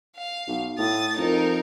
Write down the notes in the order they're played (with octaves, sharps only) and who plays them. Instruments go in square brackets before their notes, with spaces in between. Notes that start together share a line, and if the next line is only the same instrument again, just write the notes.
[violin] F5
[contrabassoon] B1
[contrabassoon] A2 [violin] D#6 A6
[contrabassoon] F2 [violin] D#4 A#4